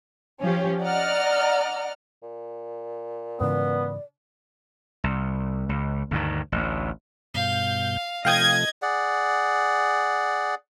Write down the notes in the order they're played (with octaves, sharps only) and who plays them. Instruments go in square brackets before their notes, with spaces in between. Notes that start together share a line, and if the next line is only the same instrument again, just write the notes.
[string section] F3 C#4 G4
D5 D#5 F#5 A#5 F6
[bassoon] A#2
[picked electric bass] G#2 C#3 E3 [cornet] B3 [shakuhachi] D5
[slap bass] C2
C#2
D2 G2 D#3
A1 D2
[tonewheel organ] G2 B2 G6 [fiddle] F5
[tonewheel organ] C3 F3 A3 [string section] D#5 G#6 [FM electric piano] F5 G5 D#6
[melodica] G#4 D5 F#5